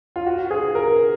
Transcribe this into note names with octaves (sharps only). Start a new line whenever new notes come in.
F4
F#4
G#4
A#4